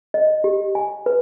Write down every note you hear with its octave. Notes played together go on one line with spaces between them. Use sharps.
D#5
G4
G#5
B4